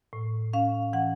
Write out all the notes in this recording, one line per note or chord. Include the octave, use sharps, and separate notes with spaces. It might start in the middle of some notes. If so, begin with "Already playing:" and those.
A2
C#4 F5
E3 F#5